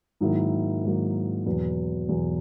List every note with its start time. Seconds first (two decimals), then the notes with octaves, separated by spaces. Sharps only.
0.21 G#2 D#3 F#3 A#3 E4
0.83 G#2 D#3 F#3 A#3 E4
1.46 E2 B2 F#3 B3
2.09 E2 B2 F#3 B3